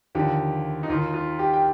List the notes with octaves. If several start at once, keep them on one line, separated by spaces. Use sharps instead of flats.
D#2 D3 F3 G4
D#4
D#2 D#3 F4
F4
G4
G5